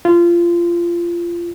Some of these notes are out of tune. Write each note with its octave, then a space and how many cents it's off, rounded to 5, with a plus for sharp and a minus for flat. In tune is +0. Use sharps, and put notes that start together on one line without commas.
F4 -20